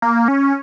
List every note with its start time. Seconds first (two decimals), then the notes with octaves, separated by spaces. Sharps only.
0.02 A#3
0.28 C#4